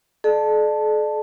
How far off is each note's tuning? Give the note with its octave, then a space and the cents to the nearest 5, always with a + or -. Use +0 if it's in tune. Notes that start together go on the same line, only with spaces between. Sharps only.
A4 -45 D5 +35 A5 +0